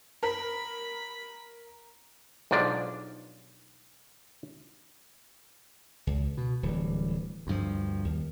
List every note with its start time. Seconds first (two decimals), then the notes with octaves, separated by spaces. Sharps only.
0.23 A#4 B5
2.51 B1 G#2 F3 D4 D5
6.07 C#2
6.37 B2
6.63 D1 E3 G3
7.47 D2 G2 F3
8.05 D#2